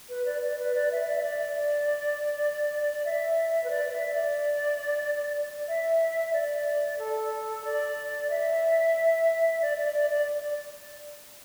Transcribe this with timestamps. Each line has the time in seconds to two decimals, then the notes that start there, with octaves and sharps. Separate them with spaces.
0.09 B4
0.26 D5
0.42 D5
0.59 B4
0.75 D5
0.92 E5
1.08 D5
1.15 E5
1.23 D5
3.05 E5
3.64 B4
3.70 D5
3.92 E5
4.14 D5
5.68 E5
6.33 D5
6.99 A4
7.64 D5
8.30 E5
9.62 D5
9.78 D5
9.94 D5
10.10 D5